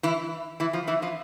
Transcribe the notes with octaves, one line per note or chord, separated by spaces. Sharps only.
E3 E4
E3 E4
F3 F4
E3 E4
F3 F4